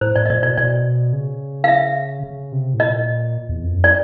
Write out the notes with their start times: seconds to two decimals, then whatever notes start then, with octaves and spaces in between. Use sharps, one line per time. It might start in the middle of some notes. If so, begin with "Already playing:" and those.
0.01 A2 C5
0.16 A2 D5
0.26 D#5
0.30 A#2 D5
0.43 B2 D5
0.57 B2 D5
1.13 C#3
1.64 F5
1.68 E5
2.23 C#3
2.52 C3
2.74 A2
2.79 A#2 D#5
3.49 E2
3.63 F2
3.77 F#2
3.84 D5